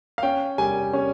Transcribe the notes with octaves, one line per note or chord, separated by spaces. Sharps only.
F5
C#4 G5
G3 G#5
C#4